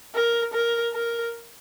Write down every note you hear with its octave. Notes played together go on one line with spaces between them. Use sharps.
A#4
A#4
A#4